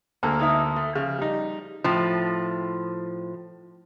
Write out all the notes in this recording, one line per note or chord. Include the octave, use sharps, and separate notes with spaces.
D2 G#3 A#3 A4
G#3 D#4 E5
A3
C#3 F3
G3 D#4
A2 F3